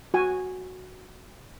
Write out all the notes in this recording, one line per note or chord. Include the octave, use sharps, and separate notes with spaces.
F#4 G#5